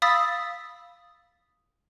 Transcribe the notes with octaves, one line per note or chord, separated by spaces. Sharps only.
F5 B5 D#6 E6 A6 B6